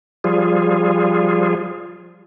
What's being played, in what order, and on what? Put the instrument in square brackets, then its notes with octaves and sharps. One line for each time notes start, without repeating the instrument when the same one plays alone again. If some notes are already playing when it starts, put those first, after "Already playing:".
[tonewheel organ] F3 G3 F4 G#4